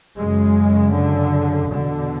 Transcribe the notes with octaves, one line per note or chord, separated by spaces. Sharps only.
F#2 C#3 G#3
D3
E2 B2 D3